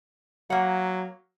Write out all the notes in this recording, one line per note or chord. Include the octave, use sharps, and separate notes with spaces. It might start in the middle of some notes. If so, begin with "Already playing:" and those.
F#3 A#3 F#5